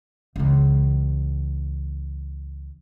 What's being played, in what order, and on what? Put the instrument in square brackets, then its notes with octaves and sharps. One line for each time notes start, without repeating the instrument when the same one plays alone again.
[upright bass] C#2 E3